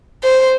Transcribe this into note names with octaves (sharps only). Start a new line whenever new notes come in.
C5